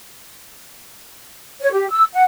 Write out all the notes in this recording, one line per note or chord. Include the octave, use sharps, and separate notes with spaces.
C#5
G4
E6
F#5